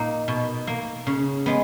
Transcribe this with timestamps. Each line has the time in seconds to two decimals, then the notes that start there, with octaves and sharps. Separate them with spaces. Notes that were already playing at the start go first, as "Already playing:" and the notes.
Already playing: A#2 A#3 D#4
0.28 B2
0.67 A#3
1.07 C#3
1.46 G#3 B3